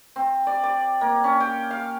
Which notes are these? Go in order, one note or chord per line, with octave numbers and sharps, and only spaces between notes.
C4
D5
D5
A#3
C#4
G5
F5